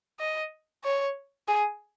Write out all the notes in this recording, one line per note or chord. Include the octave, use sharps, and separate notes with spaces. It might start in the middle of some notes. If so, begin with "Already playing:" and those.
D#5
C#5
G#4